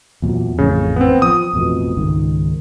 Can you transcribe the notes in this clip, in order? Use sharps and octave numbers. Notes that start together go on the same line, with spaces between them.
E2 A#2 F#3
A1 F2 A2 C#3
B3 C4
F3 D#6
A1 F2 B2
C#2 G#2 D#3